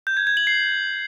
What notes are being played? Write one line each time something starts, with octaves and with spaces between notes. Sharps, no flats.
G6
G#6
G#6
F#7
C7